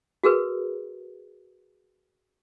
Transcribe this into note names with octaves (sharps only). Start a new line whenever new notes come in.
F#4 G#4 A#4 B4